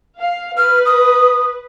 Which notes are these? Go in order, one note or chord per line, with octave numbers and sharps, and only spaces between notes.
F5
B4 F6
D#6